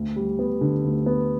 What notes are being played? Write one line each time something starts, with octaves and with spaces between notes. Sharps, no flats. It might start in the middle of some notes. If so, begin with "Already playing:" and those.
Already playing: D2
G3
B3
D3
D2
B3